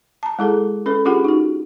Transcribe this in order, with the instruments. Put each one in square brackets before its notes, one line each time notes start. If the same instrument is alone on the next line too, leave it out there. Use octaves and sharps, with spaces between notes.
[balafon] A5 A#5
G#3 E4 G#4 A4
C#4 A4 B4
C#4 D4 F4 G4 G#4 F#5
D#4 F#4